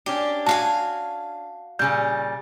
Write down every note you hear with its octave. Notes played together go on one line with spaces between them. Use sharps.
C#4 D4 G4
F#4 F5 G#5 A5
A#2 C#3 G3 G6